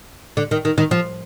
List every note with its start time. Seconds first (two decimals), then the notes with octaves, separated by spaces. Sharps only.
0.37 D3
0.51 D#3
0.65 D#3
0.78 D#3
0.91 F3